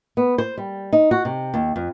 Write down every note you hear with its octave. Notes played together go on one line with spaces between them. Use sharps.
B3
C5
G3
D#4
F#4
C3
D#2
F2